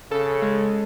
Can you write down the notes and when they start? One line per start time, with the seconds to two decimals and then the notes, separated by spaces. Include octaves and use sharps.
0.11 C#3 A4
0.42 G#3